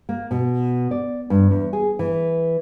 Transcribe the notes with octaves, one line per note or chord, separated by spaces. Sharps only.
A#3
B2
D5
G2
E2
G#4
E3